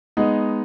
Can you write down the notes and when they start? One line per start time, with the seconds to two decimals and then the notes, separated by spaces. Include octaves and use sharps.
0.17 G#3 B3 D#4